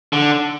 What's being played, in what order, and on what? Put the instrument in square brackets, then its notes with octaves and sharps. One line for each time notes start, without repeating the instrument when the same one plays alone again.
[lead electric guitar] D3